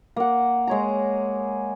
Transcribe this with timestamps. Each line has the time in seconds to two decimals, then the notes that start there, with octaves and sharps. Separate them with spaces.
0.16 A#3 F#5
0.67 G#3 C#5 A#5